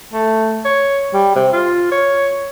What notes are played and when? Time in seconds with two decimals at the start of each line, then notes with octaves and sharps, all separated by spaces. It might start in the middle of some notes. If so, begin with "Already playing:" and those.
0.13 A3
0.65 C#5
1.14 G3
1.35 C3
1.53 F4
1.92 C#5